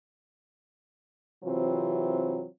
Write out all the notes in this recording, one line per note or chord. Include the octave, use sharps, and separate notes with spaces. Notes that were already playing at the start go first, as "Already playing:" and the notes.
C3 E3 F#3 C4 F4 C5